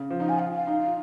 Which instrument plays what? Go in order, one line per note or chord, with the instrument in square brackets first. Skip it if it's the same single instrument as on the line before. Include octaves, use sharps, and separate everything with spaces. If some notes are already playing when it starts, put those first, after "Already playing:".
Already playing: [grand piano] C#3
F3
[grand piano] D#4 [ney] F5
[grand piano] F4 [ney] G#5
[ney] F5
F5
[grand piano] D#4
F4